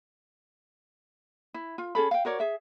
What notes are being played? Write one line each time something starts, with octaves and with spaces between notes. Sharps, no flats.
E4
F4
C#4 G#4 A4 B5
F5 G5
F#4 A#4 C#5 D5
G#4 E5